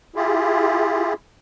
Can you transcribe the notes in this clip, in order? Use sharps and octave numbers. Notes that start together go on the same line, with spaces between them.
E4 F4 G4 G#4